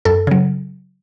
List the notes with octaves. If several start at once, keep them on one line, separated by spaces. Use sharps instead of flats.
F#2 A4
C#3 F#3